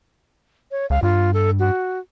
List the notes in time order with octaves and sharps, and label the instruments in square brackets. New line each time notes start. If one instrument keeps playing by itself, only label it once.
[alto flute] C#5
[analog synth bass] C#2 [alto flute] F5
[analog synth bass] G2 [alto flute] F4
[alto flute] A4
F#4